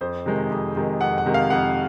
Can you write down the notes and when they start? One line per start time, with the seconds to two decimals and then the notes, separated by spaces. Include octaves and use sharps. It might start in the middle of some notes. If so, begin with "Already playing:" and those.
0.01 F2 C5
0.26 C3 D#3 G#3
0.51 F2
0.76 C3 D#3 G#3
1.01 F2 F#5
1.18 F#5
1.26 C3 D#3 G#3
1.34 F5
1.50 F2 F#5